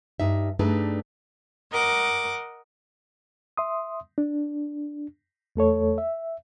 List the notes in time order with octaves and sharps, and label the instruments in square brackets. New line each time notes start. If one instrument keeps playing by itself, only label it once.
[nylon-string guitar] G2 D#4 E5
G2 A3 D4 D#4 G#4 B4
[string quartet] A#4 D#5 F#5 D6
[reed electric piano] E5 C6 D#6
D4
E2 A3 A4 C#5
E5